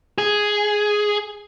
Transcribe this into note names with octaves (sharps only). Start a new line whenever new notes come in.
G#4